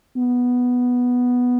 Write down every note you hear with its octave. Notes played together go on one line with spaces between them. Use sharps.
B3